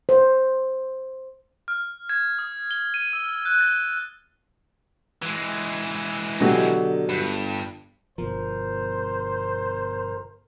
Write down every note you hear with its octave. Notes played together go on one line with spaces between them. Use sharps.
C5
F6
G#6
D#6
G7
D#7
E6
F#6
A6
E3 G#3
B2 D3 F#3 G4
G1 G2
G1 B2 F3 A#4 C5